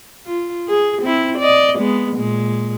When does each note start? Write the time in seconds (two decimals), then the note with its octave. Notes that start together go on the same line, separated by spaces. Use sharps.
0.25 F4
0.69 G#4
1.02 C4 E4
1.39 D5 D#5
1.79 G#3 B3
2.17 A#2 G#3